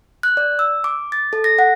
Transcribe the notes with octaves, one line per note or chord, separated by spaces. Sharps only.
F#6
D5
E6
D6
A6
A4
A#6
F#5